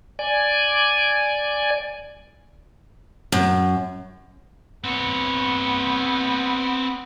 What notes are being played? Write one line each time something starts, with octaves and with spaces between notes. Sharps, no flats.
D5 G#5
F#2
B3 C4 C#5